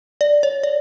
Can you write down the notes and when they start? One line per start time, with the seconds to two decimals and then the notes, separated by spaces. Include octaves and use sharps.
0.21 D5
0.43 C#5
0.63 D5